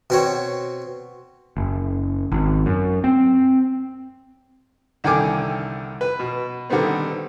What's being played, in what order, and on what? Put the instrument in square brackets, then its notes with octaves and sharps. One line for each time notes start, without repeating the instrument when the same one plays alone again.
[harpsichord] B2 C4 C#5
[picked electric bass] F#1
G#1
F#2
C4
[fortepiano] C2 D3 D#3 G5 G#5 D6
B4
B2
D3 D#3 G3 B3 C4